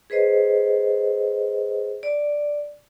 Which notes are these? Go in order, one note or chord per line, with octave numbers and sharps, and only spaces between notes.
G#4 B4 C5 D#5
D5